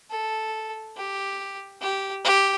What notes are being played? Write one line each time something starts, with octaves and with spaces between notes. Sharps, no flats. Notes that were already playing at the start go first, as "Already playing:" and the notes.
A4
G4
G4
G4